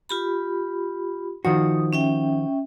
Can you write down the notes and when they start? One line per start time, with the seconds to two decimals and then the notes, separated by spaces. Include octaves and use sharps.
0.09 F4 G4 B5
1.45 D#3 F3 F#4 D#6
1.93 C#4 E5 G5